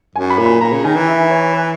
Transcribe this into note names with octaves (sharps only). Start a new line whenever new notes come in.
F#2 G#5
B5
A#2
B5
A#2 A#5
C#3
D#3 G#5
E3
E5
C#5
B4